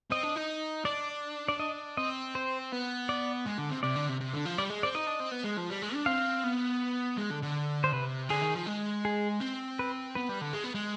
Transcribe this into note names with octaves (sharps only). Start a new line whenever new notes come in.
C4 D#5
D4
D#4
D4 D5
D5
D#5
C4 D#5
C5
B3
D5
G#3
D3
C3
C3 D5
D3
C3
C3
D3
F3
G3 D5
G#3
C4 D5
D#4 D#5
D4
C4
B3
G#3
F3
G3
G#3
D4
C4 F5
B3
G#3
D3
D3
C5
C3 B4
D3 G#4
D#3
F3
G#3
G#4
C4
B4
B3 B4
G3
D3
G#3
B3
G#3